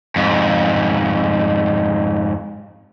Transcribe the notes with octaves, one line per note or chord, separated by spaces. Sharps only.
F2 G#2